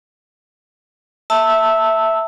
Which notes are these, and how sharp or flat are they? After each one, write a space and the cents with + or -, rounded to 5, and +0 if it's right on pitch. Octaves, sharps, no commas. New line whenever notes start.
E5 +0 A5 +20 E6 -10